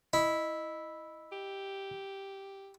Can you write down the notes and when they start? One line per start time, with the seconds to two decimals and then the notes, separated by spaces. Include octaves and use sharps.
0.13 E4 D#5
1.32 G4